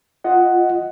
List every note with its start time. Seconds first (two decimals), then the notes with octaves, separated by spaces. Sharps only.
0.24 F4 D#5 F#5